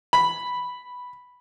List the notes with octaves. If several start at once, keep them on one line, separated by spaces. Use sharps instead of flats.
B5